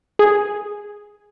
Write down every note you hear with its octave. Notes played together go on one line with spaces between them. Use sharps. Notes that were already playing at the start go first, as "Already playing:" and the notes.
G#4